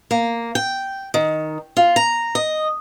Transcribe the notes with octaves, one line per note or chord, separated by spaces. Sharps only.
A#3
G5
D#3
F4
A#5
D#5